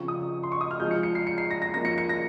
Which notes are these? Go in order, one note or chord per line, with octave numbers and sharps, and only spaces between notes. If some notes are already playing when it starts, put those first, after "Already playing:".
Already playing: C#3 F3 C4 C#6
D#6
C6
C#6
D#6
F6
C3 F3 G#3 G6
C#7
C#7
C7
C#7
C7
A#6
A#6
F3 A#3 C#4 A#6
C#7
C#7
A#6